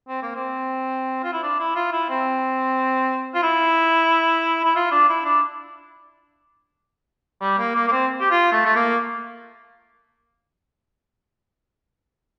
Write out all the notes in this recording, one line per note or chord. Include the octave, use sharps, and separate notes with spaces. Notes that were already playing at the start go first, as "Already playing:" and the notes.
C4
A#3
C4
F4
E4
D4
E4
F4
E4
C4
F4
E4
E4
F4
D4
E4
D4
G3
A#3
A#3
A#3
C4
G4
F4
A3
A3
A#3